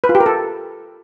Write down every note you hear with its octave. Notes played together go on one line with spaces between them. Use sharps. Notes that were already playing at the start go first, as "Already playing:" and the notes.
B4
F4
G4
A#4
A4